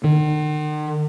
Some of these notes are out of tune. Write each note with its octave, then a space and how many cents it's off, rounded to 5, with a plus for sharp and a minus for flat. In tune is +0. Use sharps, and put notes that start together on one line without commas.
D#3 -45